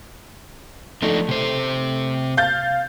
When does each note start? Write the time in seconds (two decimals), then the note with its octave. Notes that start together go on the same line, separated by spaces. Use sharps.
1.02 F3 A3 D4 D#4
1.29 C3 C5
2.37 F5 G6 A6